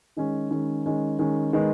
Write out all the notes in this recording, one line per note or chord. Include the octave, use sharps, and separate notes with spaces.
D#3 G#3 C#4
D#3 G#3 C#4
D#3 G#3 C#4
D#3 G#3 C#4
D#3 G#3 B3